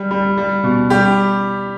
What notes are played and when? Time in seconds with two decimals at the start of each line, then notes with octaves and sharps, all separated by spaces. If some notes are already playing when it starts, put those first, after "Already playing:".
Already playing: G3
0.11 G3
0.38 G3
0.63 B2
0.90 G3 G4